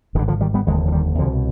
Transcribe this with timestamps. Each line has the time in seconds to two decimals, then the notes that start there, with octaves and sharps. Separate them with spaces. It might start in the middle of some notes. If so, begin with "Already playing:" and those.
0.15 G#1 G2 D3 D#3
0.28 D3 F3
0.41 D#3 G3
0.54 G3 B3
0.66 F1 D#2 D3 G#3
0.88 F3
0.92 D#3 G3
1.18 C2 B2 D3 F3